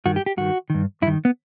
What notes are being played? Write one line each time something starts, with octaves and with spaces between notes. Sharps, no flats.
G2 D#3 F#4
G4
G4
G2 D#3 F#4
G2 D#3
G2 D#3 E4
B3